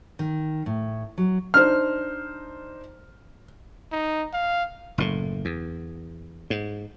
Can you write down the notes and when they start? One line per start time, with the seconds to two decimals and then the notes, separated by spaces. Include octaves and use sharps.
0.19 D#3
0.66 A2
1.18 F#3
1.54 D4 D#4 C5 F6
3.92 D#4
4.33 F5
4.98 F#1 A2
5.45 E2
6.50 G#2